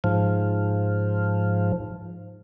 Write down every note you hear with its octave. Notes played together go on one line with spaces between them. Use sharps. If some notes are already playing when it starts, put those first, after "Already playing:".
G#2 F3